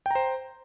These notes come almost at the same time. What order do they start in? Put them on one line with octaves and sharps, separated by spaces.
G5 A#5 C5